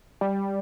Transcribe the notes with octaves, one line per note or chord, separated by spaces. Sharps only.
G3